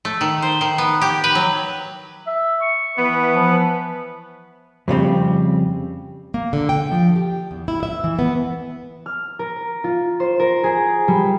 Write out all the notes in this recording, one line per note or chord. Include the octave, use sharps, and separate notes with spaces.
A3
D#3
C5
D#3
B3
G4
B4
F#3
E5
C#6
E3 B3 B4
F3
F2 C#3 G3 C4
A#3
D3
G5
F3
G4
E2
E4
E5
E3
B3
F6
A#4
F4
C5
A#4
G#4
G3